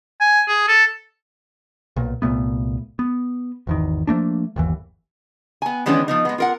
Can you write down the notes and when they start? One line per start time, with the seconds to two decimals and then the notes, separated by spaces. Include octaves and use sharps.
0.21 G#5
0.48 G#4
0.68 A4
1.96 B1 A#2
2.22 C2 A#2 A3 B3
2.99 B3
3.67 G#1 E2 D#3
4.07 F3 A3 A#3 D4
4.56 G1 D#2 E3
5.62 B3 G#5
5.86 D#3 E3 G#3 B3 C#4 D4
6.08 F3 B3 D#4
6.25 G#3 B3
6.38 F4 A#4 F#5